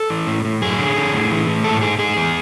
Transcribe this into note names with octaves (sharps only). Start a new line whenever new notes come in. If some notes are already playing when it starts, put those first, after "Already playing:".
Already playing: A4
E3
A2
A2
F#2 G#4
D3
D3
A2
E3
A2
G#2 A4
G#2 G#4
G#2 G#4
E2